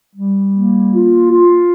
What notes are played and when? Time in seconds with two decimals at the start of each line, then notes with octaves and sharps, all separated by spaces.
0.16 G3
0.53 A#3
0.92 F4
1.31 F4